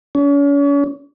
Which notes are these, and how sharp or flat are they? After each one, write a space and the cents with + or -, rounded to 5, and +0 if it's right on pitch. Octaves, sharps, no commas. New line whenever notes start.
C#4 +40